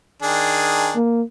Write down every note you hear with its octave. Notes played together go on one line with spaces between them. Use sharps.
D#3 D4 G#4
A#3